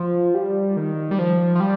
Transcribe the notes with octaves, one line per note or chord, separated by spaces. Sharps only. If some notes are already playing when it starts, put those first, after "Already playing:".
Already playing: F3
G3
D#3
G3
F3
F3
G3